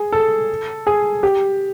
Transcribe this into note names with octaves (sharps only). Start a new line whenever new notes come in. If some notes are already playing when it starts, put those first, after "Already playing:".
Already playing: G#4
A4
G#4
G4